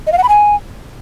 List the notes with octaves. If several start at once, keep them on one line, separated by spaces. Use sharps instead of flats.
D#5
F5
F#5
B5
G#5